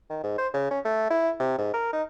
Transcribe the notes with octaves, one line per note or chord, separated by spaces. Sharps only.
D#3
G#2
C5
C#3
C#4
A3
E4
C3
G#2
A#4
D#4